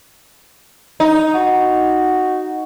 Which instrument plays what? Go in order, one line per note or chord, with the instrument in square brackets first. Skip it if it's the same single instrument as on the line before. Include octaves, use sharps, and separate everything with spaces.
[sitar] D#4
[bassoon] F#4